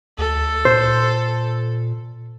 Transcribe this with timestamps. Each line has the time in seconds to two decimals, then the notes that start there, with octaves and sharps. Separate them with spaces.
0.18 D2 A4
0.65 A#2 C5